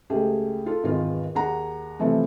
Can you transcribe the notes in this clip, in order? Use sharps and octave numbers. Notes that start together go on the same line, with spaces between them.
C#2 A3 G4 G#4
F4 A4
G#1 E2 D#3 B3 F4
D#2 G#4 F#5 A#5
C3 E3 F3 A3 B3